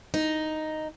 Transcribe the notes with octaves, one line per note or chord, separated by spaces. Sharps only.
D#4